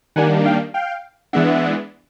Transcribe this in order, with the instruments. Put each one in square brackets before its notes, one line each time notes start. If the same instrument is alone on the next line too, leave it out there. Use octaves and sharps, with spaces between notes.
[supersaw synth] D#3 G3 A#3 D4 F#5 G#5
F5 G5
F5 G5
E3 G#3 B3 D4 E5 F#5